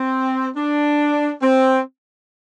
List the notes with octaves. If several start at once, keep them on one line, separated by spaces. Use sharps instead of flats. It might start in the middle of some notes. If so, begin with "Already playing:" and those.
Already playing: C4
D4
C4